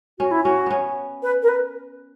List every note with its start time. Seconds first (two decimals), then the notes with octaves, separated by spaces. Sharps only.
0.19 C#4 F#4
0.31 E4
0.43 C#4 F#4
0.66 B3 C#4
1.23 B4
1.43 A#4
1.48 B4